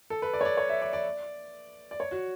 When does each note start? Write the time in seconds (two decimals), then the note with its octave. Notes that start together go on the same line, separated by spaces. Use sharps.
0.10 A4
0.22 B4
0.33 D5
0.41 C#5
0.45 D5
0.57 C#5
0.69 E5
0.82 D5
0.93 D5
1.91 D5
2.00 C#5
2.11 F#4